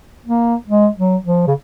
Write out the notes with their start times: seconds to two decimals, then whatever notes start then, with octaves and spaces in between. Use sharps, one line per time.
0.26 A#3
0.68 G#3
0.97 F#3
1.25 F3
1.47 C#3